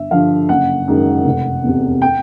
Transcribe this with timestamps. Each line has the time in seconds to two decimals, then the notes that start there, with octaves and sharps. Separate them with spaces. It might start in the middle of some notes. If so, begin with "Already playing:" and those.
Already playing: G1 E5
0.11 G2 D3 F3 F5
0.49 F#1 F#5
0.88 F#2 D#3 G#3
1.25 F1
1.64 E2 C3
2.02 G5